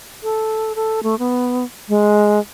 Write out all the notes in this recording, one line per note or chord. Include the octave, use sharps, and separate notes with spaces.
A4
A4
A3
B3
G#3